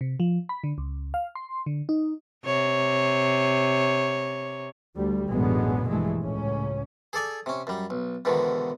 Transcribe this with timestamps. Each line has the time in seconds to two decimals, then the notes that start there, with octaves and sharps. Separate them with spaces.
0.01 C3
0.20 F3
0.49 B5
0.64 D3
0.78 C#2
1.14 F5
1.35 C6
1.66 D3
1.89 D#4
2.45 C3 C#5
4.95 D2 G3
5.29 A1 F#2 B2 D3 G#3 B3
5.87 A#1 G2 E3 G#3 A3
6.21 C#2 A2 C#4
7.13 G#4 A4 D5 G#5
7.46 C3 C#4
7.67 F#2 G3
7.90 B1
8.25 E2 G#2 B2 D3 D#3